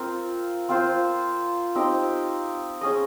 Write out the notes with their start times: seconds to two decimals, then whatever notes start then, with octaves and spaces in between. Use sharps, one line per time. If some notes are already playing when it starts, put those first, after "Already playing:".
Already playing: C4 F4 A#4
0.69 C4 F4 C5
1.75 C4 D#4 G4
2.81 C#4 G#4 D#5